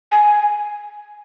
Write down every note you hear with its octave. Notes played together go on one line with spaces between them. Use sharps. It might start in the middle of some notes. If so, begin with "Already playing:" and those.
G#5